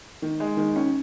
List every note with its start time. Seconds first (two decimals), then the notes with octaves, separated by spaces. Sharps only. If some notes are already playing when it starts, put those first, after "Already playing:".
0.22 D#3
0.40 G#3
0.57 D#3
0.76 C#4